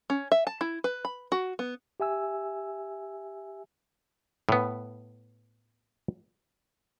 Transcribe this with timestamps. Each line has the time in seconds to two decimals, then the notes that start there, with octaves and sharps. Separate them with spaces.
0.10 C#4
0.32 E5
0.47 A5
0.61 E4
0.84 B4
1.05 B5
1.32 F#4
1.59 B3
2.00 G4 E5 G#5 E6
4.49 A2 B3